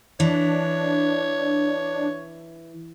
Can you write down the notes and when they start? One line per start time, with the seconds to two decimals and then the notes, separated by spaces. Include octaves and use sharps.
0.20 E3 D4 C#5